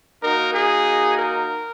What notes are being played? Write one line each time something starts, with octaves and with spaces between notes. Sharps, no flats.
A#3 D#4 F#4 A#4
G#4
A#4